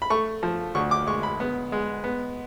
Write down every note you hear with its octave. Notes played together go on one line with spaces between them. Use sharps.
B5
A3 C#6
F3
D2 C#6
D6
G#3 C#6
B5
B3
G#3
B3